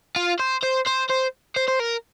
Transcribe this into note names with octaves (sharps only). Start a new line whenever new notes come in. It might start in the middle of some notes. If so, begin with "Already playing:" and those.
F4
C5
C5
C5
C5
C5
C5
A#4